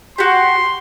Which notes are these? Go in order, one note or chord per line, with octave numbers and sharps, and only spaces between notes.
F#4 G4 C6